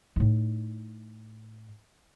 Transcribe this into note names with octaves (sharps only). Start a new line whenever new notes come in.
A2 D#4